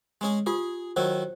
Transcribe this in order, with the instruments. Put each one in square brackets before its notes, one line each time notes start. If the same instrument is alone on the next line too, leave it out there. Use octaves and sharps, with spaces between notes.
[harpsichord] G#3 C#4 G#4
[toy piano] F4 G4 D#6 [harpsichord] G#4
[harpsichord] D#3 F#3 E4 [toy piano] C5